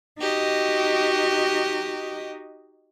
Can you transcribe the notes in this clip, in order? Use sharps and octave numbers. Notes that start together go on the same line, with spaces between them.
D#4 F#4 G4 D#5